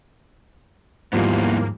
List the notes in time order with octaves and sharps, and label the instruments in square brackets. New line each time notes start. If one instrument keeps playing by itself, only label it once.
[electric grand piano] D#2 F3 G3 [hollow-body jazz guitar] G#2 [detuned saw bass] A#3 [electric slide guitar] B3 E4 F4